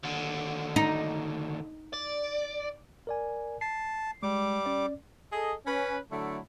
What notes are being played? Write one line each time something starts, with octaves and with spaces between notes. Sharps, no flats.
D#2 D3
D#4
D5
A#4 D5 G#5
A5 C7
G3 G#3 D6
C#4 D5
G#4 A4 D#5
C#4 B4
D3 F#3 A3 E4